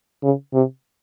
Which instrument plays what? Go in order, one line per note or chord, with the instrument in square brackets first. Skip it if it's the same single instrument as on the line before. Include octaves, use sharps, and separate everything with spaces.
[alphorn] C#3
C3